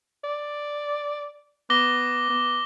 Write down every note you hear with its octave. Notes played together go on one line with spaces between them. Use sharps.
D5
B3 D6 A#6 G7
B3